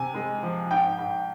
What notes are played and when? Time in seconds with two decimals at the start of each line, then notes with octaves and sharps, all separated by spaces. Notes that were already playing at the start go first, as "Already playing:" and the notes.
Already playing: C3 G#5
0.14 G#3
0.43 F3
0.71 G#2 G5
0.98 G#2